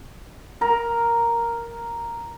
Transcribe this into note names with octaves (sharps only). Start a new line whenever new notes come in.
A#4 A#5